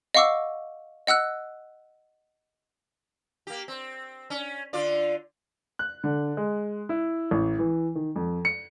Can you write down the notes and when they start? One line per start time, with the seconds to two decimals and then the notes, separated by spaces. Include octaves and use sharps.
0.15 D#5 F5 F#5 C#6 D6 E6
1.07 D#5 F#5 E6 F#6
3.47 A#3 G4
3.68 C4
4.30 C#4
4.73 D3 F4 D5
5.79 F#6
6.04 D3
6.37 G#3
6.89 E4
7.31 A1
7.59 E3
7.95 D#3
8.16 F2
8.45 C#7